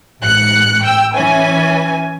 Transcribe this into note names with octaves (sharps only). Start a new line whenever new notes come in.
A1 G#2 F#6 C#7
G5 E6
E3 C#4 G#5